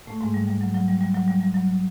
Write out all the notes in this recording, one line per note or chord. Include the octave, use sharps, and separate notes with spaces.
A2 A3
G#2 G#3
G3
G3
F#3
F#3
G3
G3
F#3
G3
G3
F#3